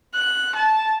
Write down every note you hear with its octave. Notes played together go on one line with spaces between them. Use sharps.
F#6
A5